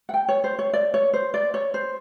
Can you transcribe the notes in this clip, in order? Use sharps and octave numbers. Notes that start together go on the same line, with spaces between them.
F#5
G5
C#5
C5
C#5
D5
C#5
C5
D5
C#5
C5